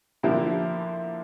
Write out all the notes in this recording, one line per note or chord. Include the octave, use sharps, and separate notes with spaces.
D3 F3 A#3 E4 G4